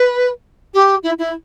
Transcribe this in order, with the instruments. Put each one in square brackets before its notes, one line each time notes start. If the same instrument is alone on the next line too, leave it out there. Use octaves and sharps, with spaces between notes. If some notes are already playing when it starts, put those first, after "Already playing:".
Already playing: [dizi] B4
G4
E4
E4